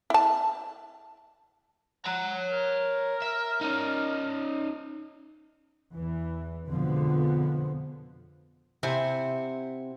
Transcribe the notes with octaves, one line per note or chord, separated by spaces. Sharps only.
E4 A5
C#5 F#5 A#5
A#4
E5
C#4 D#4
E2 E3
F2 B2 D3 F3 G#3 B3
C3 C4 E4 F#5 G#5